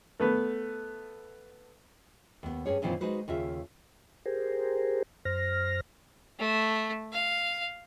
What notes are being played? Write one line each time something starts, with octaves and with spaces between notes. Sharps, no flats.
A3 B3 B4
D#2 B3
G2 C#4 G#4 C#5
F#2 A#2 D#3 E3 C4 F4
G#3 D#4 F#4 B4 C5
D#2 C#3 F4 E5
G4 G#4 A#4 C5
F#2 C5 F6 A#6
A3
F5